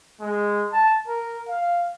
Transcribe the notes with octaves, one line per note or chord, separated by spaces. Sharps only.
G#3
A5
A#4
F5